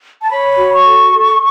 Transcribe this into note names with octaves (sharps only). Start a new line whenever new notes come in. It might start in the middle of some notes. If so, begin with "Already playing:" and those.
A5
C#5 B5
F#4
C#6
A4
A4